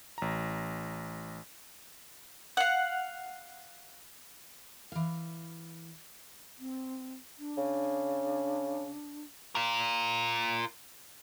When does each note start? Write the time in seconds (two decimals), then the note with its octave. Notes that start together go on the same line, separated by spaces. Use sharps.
0.18 A1 A#5
2.57 F5 F#5
4.92 E3 F5
6.59 C4
7.39 D4
7.57 C#3
9.55 F4 A#4